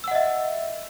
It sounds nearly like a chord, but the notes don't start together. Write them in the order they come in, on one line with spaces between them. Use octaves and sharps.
E6 F#5 D#5 E5